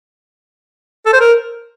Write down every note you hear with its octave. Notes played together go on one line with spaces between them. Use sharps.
A4
C5
A#4